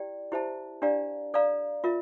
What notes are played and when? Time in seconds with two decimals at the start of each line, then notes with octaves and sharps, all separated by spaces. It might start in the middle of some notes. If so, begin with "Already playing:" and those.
Already playing: E4 G4 D5 G5
0.32 E4 G4 C5 E5 A5
0.82 D4 G4 D5 F5 A#5
1.34 A4 D5 F5 A#5
1.84 F4 A#4 E5